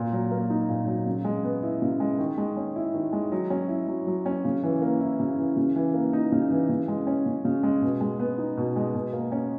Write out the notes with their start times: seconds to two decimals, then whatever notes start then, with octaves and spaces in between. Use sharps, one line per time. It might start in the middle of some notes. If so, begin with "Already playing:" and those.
Already playing: A#2
0.12 F#3
0.31 A#3
0.50 D#4
0.69 A#2
0.87 F#3
1.06 C#3
1.25 G#3
1.44 B3
1.63 E4
1.82 C#3
2.00 G#3
2.18 D#3
2.38 G#3
2.57 C#4
2.76 E4
2.94 D#3
3.13 G#3
3.32 F#3
3.50 C#4
3.69 E4
3.88 F#3
4.07 F#3
4.26 C#4
4.45 C#3
4.63 E3
4.82 A#3
5.01 E4
5.20 C#3
5.38 E3
5.57 C#3
5.76 E3
5.94 A#3
6.13 D#4
6.32 C#3
6.51 E3
6.69 C#3
6.88 G#3
7.07 C#4
7.26 C#3
7.45 C#3
7.63 G#3
7.82 B2
8.01 G#3
8.20 B3
8.38 D#4
8.57 B2
8.76 G#3
8.94 B2
9.13 A#3
9.32 C#4